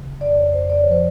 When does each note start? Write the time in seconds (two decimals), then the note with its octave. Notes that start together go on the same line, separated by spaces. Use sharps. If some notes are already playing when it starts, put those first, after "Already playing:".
Already playing: C#3
0.21 F2 D5
0.37 C#5
0.53 F2 C5
0.70 D5
0.81 F3 C#5
0.92 C5